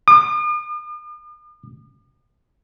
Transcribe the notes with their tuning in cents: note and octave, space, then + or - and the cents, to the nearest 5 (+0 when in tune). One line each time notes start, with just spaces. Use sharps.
D#6 -45